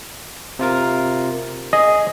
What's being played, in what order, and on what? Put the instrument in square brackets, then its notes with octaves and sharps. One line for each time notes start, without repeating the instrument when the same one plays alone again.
[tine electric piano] C3 F4 A#4
[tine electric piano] G#4 [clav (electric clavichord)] D#5